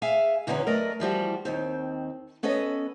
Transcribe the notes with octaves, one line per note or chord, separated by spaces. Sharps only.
G#4 E5 F5 G#5
E2 D3 E3 F#3 B3 C#4
F#3 A3 A#4 B4 D5 D#5
E3 F3 G3 F#4
D#2 D#3 C4
B3 C#4 A4 B4 D#5